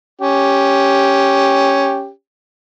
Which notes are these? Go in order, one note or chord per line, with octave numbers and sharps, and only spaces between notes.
C#4 G4